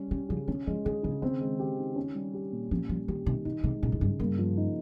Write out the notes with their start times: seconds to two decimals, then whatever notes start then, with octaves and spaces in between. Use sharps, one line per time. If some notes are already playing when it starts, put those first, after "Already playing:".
Already playing: G3 C#4
0.11 C#3 G4
0.29 C#3 F3
0.48 D#3 C#4
0.67 F3 G#3
0.85 D#3 G#4
1.03 C#3 F3
1.22 D#3 C4
1.40 G#3
1.59 G4
1.79 D#3
1.96 C#4
2.15 G3
2.34 G4
2.52 A#2
2.71 F3 C#4
2.89 F3 G3
3.08 D#3 G4
3.26 C3 D#3
3.45 C3 D#4
3.64 C3 G#3
3.82 A#2 C#3
3.92 F2
4.01 G2 C#3
4.20 G2 A#3
4.39 F3
4.57 D#4